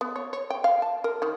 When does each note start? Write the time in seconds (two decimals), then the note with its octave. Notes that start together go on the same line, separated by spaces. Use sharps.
0.01 B3
0.16 C#5
0.33 C#5
0.50 G5
0.64 F5
0.82 A5
1.04 A#4
1.22 D#3